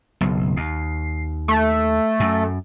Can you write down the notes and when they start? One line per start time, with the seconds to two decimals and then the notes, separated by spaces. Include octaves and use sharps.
0.21 F#1 B1
0.56 D#2 C7
1.48 A3
2.20 F#2